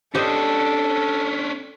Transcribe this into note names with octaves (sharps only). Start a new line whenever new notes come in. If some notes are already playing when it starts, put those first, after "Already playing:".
C#4 D4 G4 A4 C5 D#5